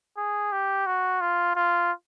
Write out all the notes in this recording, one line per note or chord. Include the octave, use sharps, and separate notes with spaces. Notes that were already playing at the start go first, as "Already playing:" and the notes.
G#4
G4
F#4
F4
F4